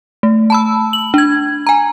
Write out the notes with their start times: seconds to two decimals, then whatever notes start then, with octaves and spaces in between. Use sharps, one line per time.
0.23 A3
0.50 A5 B5 E6
0.93 F#7
1.14 D4 G#6
1.67 G#5 A#5